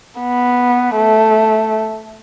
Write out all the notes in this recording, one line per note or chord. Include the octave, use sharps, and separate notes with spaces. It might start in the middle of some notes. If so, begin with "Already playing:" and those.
B3
A3